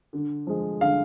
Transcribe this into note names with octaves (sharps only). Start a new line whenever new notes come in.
D3
F3 G#3
D3 F5